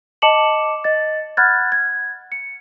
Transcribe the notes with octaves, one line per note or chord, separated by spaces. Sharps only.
D#5 A5 D6 C#7 E7 F#7
D#5 A6
F#5 B5 F6 F#6 G#6 A6
G#6
C#7